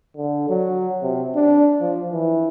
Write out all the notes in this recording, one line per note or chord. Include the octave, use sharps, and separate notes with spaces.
D3
F#3
C3
D4
F3
E3